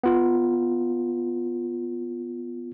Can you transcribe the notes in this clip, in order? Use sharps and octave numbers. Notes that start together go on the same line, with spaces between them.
B3 F4